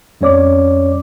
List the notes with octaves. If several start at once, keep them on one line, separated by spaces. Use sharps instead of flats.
F2 G3 C#4 C#5 D5 D6